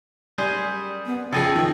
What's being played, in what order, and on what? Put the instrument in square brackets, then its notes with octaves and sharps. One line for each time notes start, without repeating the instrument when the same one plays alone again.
[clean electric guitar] F#2 G#4 C5 [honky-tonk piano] G3
[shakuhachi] B3
[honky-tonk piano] C#3 F3 G#4 [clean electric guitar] A4 D#5 [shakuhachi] G5
[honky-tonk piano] D#3 F3